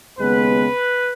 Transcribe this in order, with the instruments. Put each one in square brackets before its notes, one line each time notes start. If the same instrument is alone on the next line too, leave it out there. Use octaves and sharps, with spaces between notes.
[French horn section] D#2 C#3 G#3 B3 [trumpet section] B4